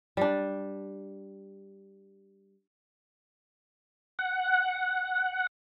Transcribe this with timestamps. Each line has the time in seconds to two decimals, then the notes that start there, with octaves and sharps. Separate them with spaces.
0.17 G3 D4
4.19 F#5